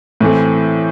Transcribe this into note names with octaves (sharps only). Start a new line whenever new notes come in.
A2 E3 A3 C4